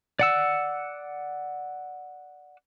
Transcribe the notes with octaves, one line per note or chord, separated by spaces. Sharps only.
D5 F#5 E6